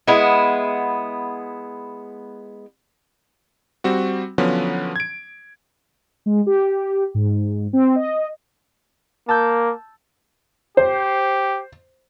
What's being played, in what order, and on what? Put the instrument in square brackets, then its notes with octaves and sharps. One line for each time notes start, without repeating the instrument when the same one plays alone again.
[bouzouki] G#3 B3 E4
[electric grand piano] G3 C4 F#4
D3 F3 F#3 B3 C#4
G#6 D7
[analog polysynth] G#3
G4
G#2
C4
D#5
[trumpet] A#3 [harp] A5 E6 G6
[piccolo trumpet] G4 [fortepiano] C5